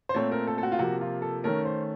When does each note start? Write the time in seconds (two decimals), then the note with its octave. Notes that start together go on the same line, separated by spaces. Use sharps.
0.09 C5
0.14 A#2 A3 C4 C#5
0.32 A#4
0.47 A4
0.58 A4
0.63 F#4
0.72 F4
0.79 C3 F3 A#3 F#4
1.01 F4
1.22 A4
1.44 D#3 A3 C#4 A#4
1.65 C5